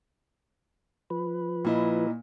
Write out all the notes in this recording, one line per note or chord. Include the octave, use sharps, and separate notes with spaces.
F3 B4
A#2 A#3 E4 D#5